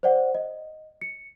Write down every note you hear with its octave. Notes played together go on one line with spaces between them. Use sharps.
C5 D5 F#5
D#5
C#7